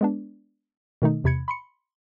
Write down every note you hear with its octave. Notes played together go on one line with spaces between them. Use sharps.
G#3 B3 D4
B2 D#3 A3 D#4
E2 C3 B5 G#6 C#7
B5 C6 C#7